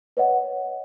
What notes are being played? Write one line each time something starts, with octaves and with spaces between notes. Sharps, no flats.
B4 C#5 D#5 F#5